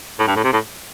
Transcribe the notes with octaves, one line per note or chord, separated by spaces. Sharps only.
A2
G2
A2
C3
A2